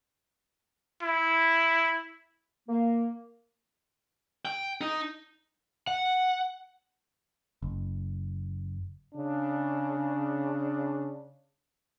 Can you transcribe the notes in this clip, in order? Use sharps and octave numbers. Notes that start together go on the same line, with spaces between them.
E4
A#3
G5
D#4
F#5
F#1
C#3 D4